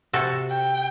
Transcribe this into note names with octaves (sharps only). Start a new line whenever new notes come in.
C3 F#4 A4
G5